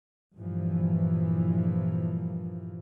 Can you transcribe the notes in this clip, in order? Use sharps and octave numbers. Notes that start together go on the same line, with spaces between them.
G2 A#2 E3 F3